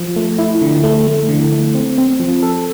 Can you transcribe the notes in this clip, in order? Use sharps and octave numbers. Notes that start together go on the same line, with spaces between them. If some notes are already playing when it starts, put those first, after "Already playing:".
Already playing: F3
A3
E4
D3
A3
A3
D3
A3
C4
C4
F3
A4